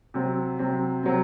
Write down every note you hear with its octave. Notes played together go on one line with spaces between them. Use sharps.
C3 F#3 C4
C3 F#3 C4
C3 F#3 C4